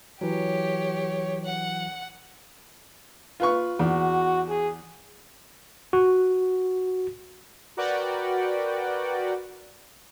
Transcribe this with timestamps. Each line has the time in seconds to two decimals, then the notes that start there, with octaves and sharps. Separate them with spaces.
0.21 E3 F#3 G4 C#5
1.45 F#5
3.40 F4 B4 C#6
3.79 E2 F#4
4.49 G#4
5.93 F#4
7.77 F#4 A#4 B4 D5 F#5 G5